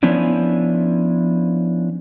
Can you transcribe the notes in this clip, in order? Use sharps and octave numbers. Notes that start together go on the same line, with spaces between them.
F3 B3 C#4 D4 E4